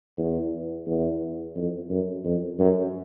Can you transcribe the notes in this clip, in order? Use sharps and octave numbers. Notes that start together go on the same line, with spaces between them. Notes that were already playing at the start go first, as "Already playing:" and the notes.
E2
E2
F2
F#2
F2
F#2